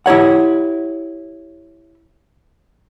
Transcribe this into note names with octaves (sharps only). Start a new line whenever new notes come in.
E4 G4 C#5 F#5